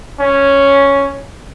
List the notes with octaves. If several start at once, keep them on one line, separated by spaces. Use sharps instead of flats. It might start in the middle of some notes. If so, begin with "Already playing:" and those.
C#4